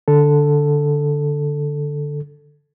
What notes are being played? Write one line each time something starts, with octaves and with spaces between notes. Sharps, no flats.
D3 A4